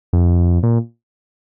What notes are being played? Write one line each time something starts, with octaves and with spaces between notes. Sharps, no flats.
F2
A#2